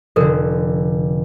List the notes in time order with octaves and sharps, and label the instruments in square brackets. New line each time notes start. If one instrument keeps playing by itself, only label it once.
[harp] F1 D3 [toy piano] A4 A#4